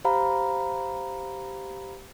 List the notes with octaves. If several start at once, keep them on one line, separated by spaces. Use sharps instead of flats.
G4 C5 F5 A#5 B5